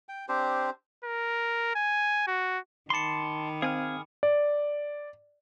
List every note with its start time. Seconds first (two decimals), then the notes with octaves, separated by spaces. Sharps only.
0.09 G5
0.28 C4 D4 G4 C5
1.05 A#4
1.75 G#5
2.27 F#4
2.90 D#3 A5 B5 C6 D6 C#7
3.62 C4 G#4 F5 G#5 F6
4.23 D5